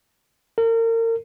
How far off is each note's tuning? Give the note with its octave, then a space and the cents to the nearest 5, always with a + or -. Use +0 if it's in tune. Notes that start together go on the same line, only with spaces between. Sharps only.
A#4 -35